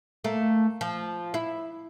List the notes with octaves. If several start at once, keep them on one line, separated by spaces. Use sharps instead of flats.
A3 A#3
F3
E4